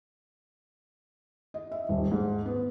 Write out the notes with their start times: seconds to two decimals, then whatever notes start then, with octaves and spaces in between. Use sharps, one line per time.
1.54 D#5
1.72 E5
1.89 D#1
2.12 G#2
2.46 B3